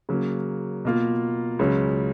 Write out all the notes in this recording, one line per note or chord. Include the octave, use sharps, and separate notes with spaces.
C#3 F#3 A#3
B2 A#3 F4
C#2 C#3 F#3